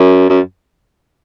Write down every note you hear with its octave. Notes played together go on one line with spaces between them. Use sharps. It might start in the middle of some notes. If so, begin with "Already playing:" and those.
Already playing: F#2
F#2